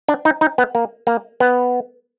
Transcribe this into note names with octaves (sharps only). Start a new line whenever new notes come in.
D4
D#4
D#4
B3
A#3
A#3
B3